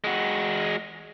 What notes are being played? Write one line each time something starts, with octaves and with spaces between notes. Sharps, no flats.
G#3 F#4